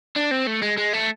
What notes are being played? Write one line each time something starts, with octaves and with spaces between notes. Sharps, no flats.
D4
C4
A3
G#3
G#3
A3